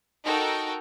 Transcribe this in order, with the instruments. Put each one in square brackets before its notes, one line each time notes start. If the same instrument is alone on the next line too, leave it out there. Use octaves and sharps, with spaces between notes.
[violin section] D#4 F#4 A4 A#4 G5